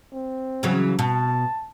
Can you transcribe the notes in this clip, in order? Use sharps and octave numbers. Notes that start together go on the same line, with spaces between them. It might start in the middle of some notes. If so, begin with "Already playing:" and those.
C4
C#3 E3 F#3
B2 A5